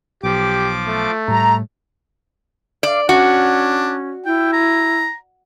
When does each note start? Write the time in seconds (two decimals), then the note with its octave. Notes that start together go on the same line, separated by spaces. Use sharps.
0.23 B1 F3 G4 D6
0.86 A3
1.28 A2 G3 A#5
2.83 D5 F5
3.09 C#4 D4 F#4
4.26 E4 G5
4.53 A#5